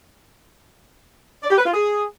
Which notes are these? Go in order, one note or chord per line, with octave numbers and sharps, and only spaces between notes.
D5
G4
B4
F4
G#4